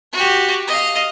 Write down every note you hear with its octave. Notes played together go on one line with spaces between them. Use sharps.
F#4 G4
D#5 F5